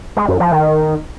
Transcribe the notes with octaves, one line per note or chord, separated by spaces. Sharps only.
G#3
F#2
F3
D#3